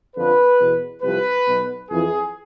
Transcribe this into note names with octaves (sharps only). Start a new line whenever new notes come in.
F2 D3 F3 B4
E2 B2
C2 C3 F3 B4
B1 B2
F2 E3 G#4